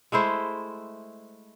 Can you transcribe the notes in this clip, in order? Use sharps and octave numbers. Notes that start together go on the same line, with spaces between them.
G#3 A3 E4 C5